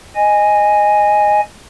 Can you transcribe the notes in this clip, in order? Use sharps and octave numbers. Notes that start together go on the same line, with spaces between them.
D#5 G#5